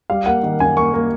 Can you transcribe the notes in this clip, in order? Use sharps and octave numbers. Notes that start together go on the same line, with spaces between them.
G3 F5
A#3 F#5
D#3
F#2 G#5
A#3 C#6
A#3